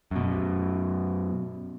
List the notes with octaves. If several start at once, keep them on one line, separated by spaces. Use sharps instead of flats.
F#2 B2